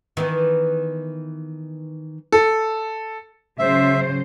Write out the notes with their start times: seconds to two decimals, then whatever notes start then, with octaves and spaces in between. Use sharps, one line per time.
0.17 D#3 E3 B3
2.32 A4
3.59 C#3 F#3 C5 E5